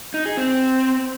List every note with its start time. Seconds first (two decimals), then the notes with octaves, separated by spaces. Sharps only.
0.14 D#4
0.26 G#4
0.37 C4